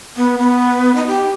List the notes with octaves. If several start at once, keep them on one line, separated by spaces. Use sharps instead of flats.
B3
B3
D#4
G4